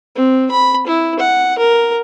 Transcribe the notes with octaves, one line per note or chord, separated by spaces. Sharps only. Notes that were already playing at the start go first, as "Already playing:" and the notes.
C4
B5
E4
F#5
A#4